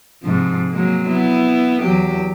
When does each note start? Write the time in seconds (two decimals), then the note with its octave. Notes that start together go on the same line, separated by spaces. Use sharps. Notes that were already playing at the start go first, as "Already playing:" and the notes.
0.23 G#2 C3 F3
0.71 F#3 G#3 A#3
1.08 B3 E4
1.82 E2 F#3 G4